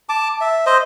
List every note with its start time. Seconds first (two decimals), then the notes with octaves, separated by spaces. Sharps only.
0.09 A5 D6
0.41 E5
0.66 C5 D#5